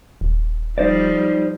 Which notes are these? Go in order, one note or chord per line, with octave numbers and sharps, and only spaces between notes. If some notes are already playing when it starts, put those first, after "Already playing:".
D#1
F3 G3 D#4 C5 D5